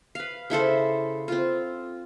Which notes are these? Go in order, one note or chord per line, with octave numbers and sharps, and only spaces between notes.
B4 F5
C#3 E4 A4 C5
C4 F4